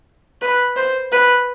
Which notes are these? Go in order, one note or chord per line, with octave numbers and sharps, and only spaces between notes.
B4
C5
B4